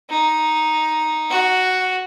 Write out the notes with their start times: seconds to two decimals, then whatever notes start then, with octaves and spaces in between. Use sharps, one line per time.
0.10 D#4
1.30 F#4